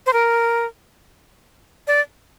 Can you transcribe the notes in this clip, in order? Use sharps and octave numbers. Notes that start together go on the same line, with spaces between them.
C5
A#4
D5